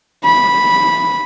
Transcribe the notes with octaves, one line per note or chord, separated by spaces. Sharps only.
B5